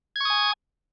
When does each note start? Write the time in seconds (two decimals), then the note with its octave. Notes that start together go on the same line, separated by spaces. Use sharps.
0.16 G#6
0.20 C#6
0.25 D#6
0.30 G#5